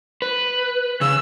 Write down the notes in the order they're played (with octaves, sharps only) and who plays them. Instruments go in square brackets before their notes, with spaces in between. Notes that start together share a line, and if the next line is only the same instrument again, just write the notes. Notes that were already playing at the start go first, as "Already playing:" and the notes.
[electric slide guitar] B4
[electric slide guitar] C#3 [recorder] E6